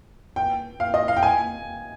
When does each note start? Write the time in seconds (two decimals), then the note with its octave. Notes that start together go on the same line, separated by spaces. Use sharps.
0.36 G5
0.80 F5
0.94 D#5
1.08 F5
1.17 G5
1.23 G#5